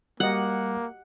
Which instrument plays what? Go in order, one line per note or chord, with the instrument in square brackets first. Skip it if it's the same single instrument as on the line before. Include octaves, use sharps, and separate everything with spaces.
[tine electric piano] G3 [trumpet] A#3 [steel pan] F#4 G4 D#5 [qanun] F#5